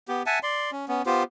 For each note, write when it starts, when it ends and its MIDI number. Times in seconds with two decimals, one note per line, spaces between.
0.08 0.23 59
0.08 0.23 67
0.26 0.39 76
0.26 0.39 78
0.26 0.39 80
0.26 0.39 81
0.43 0.71 74
0.43 0.71 84
0.72 0.85 61
0.88 1.02 59
0.88 1.02 61
1.06 1.23 59
1.06 1.23 65
1.06 1.23 67
1.06 1.23 72